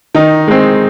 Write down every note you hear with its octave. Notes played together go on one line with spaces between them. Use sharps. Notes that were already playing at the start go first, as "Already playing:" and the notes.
D#3 D#4
G#3 C4